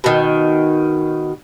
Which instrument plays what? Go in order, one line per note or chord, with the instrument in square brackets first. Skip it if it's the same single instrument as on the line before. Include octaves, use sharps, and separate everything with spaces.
[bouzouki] B2 D#3